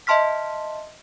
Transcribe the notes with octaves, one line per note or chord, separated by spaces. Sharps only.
D#5 E5 A5 C6 F6 B6